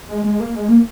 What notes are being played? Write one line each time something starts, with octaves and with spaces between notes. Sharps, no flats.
G#3
G#3
A#3
G#3
A#3